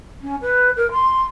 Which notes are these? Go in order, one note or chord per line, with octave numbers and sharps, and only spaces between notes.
C#4
B4
A#4
C6